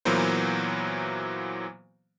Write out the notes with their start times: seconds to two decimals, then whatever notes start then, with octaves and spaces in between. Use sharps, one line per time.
0.05 A#2 E3 F#3 A#3 B3 C5